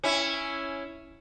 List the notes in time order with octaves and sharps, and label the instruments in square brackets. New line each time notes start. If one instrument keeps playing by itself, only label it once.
[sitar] C#4 E4